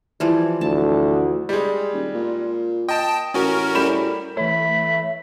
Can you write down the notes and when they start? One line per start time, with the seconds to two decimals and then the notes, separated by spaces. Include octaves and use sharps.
0.20 E3 F3 G3
0.61 D2 A5
1.49 G3 G#3
1.93 D#1
2.14 A#2
2.89 D#5 G5 A5
3.34 A1 C#4 F#4 A#4
3.75 A2 G3 B5 E7
4.37 E3 A3 C#5 E5 B5